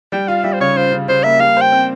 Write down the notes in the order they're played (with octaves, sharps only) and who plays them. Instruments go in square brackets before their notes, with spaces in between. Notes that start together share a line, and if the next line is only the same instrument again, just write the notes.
[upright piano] G3 [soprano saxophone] G5
[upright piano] F4 [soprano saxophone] F5
[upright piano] G3 [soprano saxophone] E5
[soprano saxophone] C5
[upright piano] C#3 [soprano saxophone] C#5
[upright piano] F4 [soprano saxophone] C5
[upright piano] C#3
[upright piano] C#3 [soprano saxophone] C5
[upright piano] A#3 [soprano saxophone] E5
[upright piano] G3 [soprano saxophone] F5
[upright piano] C5 [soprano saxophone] G5
[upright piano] C4